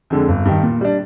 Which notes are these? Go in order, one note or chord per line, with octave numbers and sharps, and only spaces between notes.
F2 D3 G#3
G1
G2 D#3
A#2
G3 D4